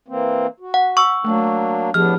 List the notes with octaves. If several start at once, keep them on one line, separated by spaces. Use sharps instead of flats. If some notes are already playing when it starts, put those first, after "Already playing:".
E3 A#3 C4
F#4
F#5
C#6 E6
F#3 A3 A#3 D4
A2 F3 B3 D4 G4 G#4 F6